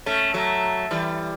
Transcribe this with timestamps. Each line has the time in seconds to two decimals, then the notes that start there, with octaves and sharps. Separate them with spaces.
0.06 A3 C#4
0.34 F#3 A3
0.91 E3 G3